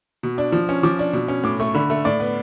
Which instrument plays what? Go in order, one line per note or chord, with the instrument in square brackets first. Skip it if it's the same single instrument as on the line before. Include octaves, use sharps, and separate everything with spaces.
[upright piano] B2
D4
F3
C#4
F3 D6
D4
B2
C#4
A2 D6
A3 C#6
D3 B5
A3
A2 D5
B3